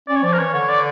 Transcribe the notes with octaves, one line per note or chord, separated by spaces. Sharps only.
C#4 D5
C#5
F3 D5
A#4
E3 C#5
D3 C#5
D5